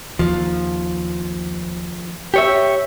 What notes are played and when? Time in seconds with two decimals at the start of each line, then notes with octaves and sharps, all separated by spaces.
0.19 D#2 F3
2.34 G4 C#5 E5